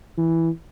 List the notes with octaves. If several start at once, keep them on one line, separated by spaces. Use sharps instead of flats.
E3